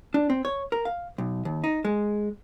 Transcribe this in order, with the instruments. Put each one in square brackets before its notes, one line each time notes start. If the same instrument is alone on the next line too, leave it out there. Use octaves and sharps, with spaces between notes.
[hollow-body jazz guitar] D4
C4
C#5
A#4
F5
B1
D#2
D#4
G#3